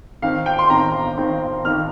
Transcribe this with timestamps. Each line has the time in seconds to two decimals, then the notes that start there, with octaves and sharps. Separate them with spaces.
0.22 D#3 C4 F5
0.46 G5
0.59 C6
0.69 D#3 C4 A#5
1.17 D#3 C4
1.65 D#3 C4 F6